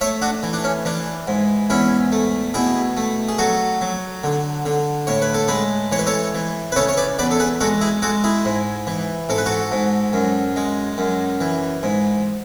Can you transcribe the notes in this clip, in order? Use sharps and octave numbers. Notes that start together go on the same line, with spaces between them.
A3 C#5 E5
D4 F#4
E3
D4
C#4
E3 D4
G#2
E2 C#4 E4
A3
B2 E4 G#4
A3
G#4
F#3 F#4 A4
F#3
D3
D3
A2 C#5
B4
A4
G#3 G#4 B4
E3 C#5
B4
A4 C#5
E3
B4
C#3 A4 C#5
C#5
B4 D5
E2 B4 D5
A4
G#4 B4
G#3 F#4 A4
E4 G#4
G#3 F#4 A4
E4 G#4
G#2
E3
G#2 A4
B4
F#4 A4
G#2
F#2
G#3
F#2
E3
G#2